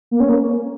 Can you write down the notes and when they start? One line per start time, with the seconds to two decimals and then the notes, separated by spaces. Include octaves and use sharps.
0.11 A#3
0.20 C#4
0.29 A#3